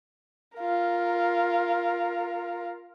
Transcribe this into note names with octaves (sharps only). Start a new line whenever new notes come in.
F4 A#4